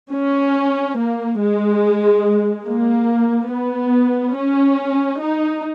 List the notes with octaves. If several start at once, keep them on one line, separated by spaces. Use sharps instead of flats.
C#4
A#3
G#3
A#3
B3
C#4
D#4